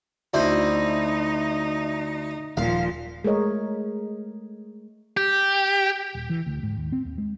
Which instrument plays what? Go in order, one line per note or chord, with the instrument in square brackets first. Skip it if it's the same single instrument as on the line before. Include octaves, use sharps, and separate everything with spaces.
[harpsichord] D2 E4 C5 [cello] D#4
[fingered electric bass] D#1 [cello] A#2 F3 [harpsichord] F5
[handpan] G#3 A3 A#4 C#5 D#5
[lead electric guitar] G4
[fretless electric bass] D#1
E3
D2
G#2
D#2
C4
D#2
G#3